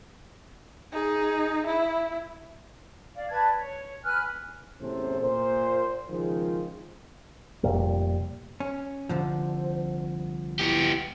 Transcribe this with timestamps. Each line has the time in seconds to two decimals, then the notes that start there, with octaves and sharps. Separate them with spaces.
0.92 D#4 G#4
1.66 E4
3.15 D5 F5
3.29 B4 D5 A5 G#6
3.57 C#5
4.04 B4 G#5 F6 F#6
4.80 E2 A2 C3 C#4 A4 C5
5.21 A#2 C5
6.09 C#2 D#3 F3 F4 G#4 C5
7.63 F1 A#2 G3
8.60 C#4
9.09 C2 D3 F3 C5
10.59 B3 E4 G4